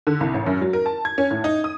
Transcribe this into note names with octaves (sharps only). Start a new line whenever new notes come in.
D3
C2
A1
F#2
F#3
A#4
A5
G#6
C#4
A2
D#4
D#6